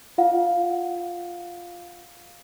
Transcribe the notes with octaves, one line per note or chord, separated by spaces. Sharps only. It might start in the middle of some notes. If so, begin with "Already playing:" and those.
F4 F5 F#5